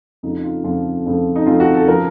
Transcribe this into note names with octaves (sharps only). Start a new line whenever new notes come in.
F2 C#3 F3 A3 D#4
D#4
F4
F2 C#3 F3 A3 F4
F2 C#3 F3 A3
D#4
F2 C#3 F3 A3 F4
F#4
A4
C#3 F3 A3 A#4